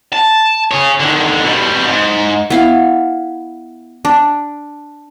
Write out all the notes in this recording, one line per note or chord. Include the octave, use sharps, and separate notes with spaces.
A5
G#4 C#5
D3 D#3
B2 G3
G#2
B3 E4 F5
D4